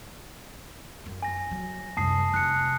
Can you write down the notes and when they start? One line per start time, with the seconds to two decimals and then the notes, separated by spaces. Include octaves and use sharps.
1.06 F#2
1.23 G#5 A#6
1.51 F#3
1.97 C2 F#2 A5 D#6 C7
2.34 F1 F#6 C#7